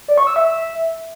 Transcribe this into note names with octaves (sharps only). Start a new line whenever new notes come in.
D5
C#6
E6
E5